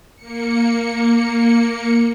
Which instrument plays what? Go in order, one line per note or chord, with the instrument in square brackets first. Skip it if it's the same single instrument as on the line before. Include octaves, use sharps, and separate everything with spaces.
[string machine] A#3 C#7